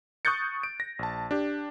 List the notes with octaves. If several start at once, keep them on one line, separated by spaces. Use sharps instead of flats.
C#6 D#6 F#6 G6 A6 C#7
D7
A#6
A#1 A5
D4 G4